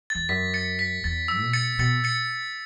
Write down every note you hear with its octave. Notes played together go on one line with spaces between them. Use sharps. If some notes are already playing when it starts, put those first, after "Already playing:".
A6
E2
F#2 B6
A6 C#7
B6
E2 A6
E6
B2
A6 C#7
B2 A6 C#7
A6 C#7